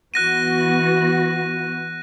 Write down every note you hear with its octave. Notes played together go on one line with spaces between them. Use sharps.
E3 B3 F#4 F#6 A#6 D#7